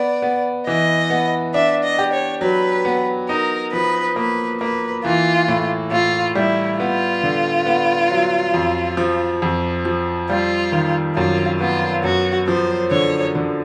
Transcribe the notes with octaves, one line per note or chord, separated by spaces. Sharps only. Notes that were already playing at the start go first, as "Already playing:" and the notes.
Already playing: B3 D5
B3
E3 D#5
B3
D4 E5
D#5
G4
C#5
F#3 B4
B3
D#4 A#4
F3 B4
A#3 B4
A#3 B4
E3 F4
A2
A2 F4
G3 E4
B3 F4
D3
B3
F#3
F2
F3
F2
F3
G3 F4
D#3
F#2 F4
B3 F4
F#2 F#4
F3 C5
D3 C#5
D3